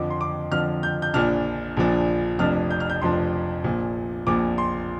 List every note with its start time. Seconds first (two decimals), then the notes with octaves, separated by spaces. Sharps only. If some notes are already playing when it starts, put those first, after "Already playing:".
Already playing: F2 D3 F3 D6
0.10 C6
0.21 D6
0.52 F2 D3 F3 F6
0.83 G6
1.02 G6
1.14 A#1 A#2 F3 D4 F6
1.77 A#1 A#2 F3 D4
2.39 F1 F2 F3 D4 F6
2.71 G6
2.80 F6
2.90 G6
3.02 F1 F2 F3 D4 C6
3.64 A#1 A#2 F3
4.27 A#1 A#2 F3 D6
4.58 C6